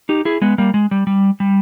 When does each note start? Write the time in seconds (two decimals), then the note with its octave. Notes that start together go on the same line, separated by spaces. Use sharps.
0.09 D#4 G4
0.25 E4 G#4
0.42 G#3 B3
0.58 G3 A#3
0.74 G#3
0.91 G3
1.07 G3
1.40 G3